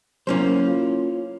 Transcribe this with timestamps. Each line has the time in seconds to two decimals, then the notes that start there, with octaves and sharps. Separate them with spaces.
0.27 F#3 A#3 C#4 E4 C5
0.68 F4